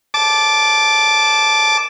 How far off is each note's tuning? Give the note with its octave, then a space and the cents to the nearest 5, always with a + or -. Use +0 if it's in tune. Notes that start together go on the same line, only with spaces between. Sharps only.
A5 -15 D6 +0